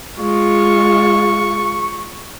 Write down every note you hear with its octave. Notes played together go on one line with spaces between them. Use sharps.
G#3 F4 C#6